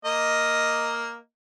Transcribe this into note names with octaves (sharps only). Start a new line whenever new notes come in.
A#3 D#5